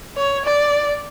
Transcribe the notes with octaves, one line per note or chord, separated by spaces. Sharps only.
C#5
D5